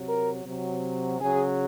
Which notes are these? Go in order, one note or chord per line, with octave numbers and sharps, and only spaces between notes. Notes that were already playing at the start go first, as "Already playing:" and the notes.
Already playing: C3 F#3
A#4
C3 F#3
C#3 F#3 G#4